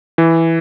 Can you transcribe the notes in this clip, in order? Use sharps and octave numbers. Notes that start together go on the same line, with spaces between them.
E3